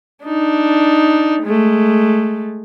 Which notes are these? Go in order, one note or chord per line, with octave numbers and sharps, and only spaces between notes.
D4 D#4
G#3 A3